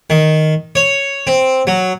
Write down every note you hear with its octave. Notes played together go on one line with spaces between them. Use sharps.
D#3
C#5
C4
F#3